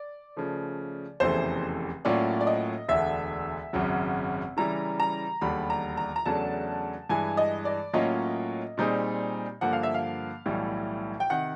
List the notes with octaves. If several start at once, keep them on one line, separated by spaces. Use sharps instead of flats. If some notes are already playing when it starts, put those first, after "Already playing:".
Already playing: D5
C#3 F3 A3
F1 E2 C#3 E3 A3 C5
A2 F#3 A#3 C#4 F4 D5
D5
D#5
E1 D2 D3 E5
G#1 F#2 C#3 F#3
C#3 E3 G3 A#5
A#5
E1 D#2 D3 G3 B5
A#5
A#5
A#5
E2 C#3 F#3 A3 D4 A5
G2 E3 G#3 G#5
D#5
D5
A2 F#3 A#3 C#4 F4 D#5
A#2 G3 C4 D#4 G#4
G2 D3 F3 A#3 F#5
F5
E5
F5
B1 A2 E3 G3
G5
C3 D#3 F#5